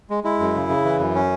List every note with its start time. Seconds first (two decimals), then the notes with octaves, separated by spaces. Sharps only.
0.10 G#3
0.24 G#3 E4
0.40 F#2
0.55 C#3
0.69 C#3
0.85 E3
0.99 F#2
1.15 C#4